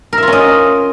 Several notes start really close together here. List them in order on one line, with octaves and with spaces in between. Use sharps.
A#4 E5 F4 C#4 D#5